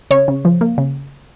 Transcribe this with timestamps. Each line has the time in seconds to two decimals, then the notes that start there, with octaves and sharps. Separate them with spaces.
0.11 C#3 C#5
0.28 C#3
0.45 F3
0.61 A#3
0.78 C#3